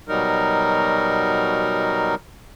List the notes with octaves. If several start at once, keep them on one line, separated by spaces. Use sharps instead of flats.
B2 F#3 G3 D#4 A#4